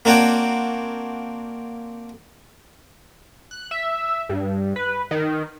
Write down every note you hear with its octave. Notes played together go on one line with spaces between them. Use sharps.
A#3 C4 D4 F#4 C#5 G5
F#6
E5
G2
B4
D#3